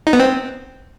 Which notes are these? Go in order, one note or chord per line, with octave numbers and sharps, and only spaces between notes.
D#4
B3
C4